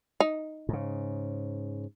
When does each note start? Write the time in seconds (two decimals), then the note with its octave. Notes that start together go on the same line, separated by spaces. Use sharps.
0.20 D#4
0.69 G#2 C#3